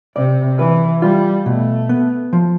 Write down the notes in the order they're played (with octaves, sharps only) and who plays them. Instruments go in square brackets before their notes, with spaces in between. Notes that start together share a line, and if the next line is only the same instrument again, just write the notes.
[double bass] C3 [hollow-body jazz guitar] D5
[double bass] E3 [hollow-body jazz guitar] B4
[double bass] G3 [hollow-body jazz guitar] F4
[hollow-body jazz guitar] B2 [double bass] A3
[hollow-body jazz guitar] B3
F3